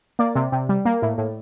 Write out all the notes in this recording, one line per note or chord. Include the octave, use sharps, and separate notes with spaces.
A#3 D5
C3
C3
G3
A#3
A2
A2